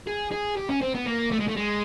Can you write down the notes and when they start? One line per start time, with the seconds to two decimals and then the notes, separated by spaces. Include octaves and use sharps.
0.07 G#4
0.31 G#4
0.57 G4
0.69 C#4
0.81 C4
0.94 B3
1.06 A#3
1.31 A3
1.39 G#3
1.47 A3
1.56 G#3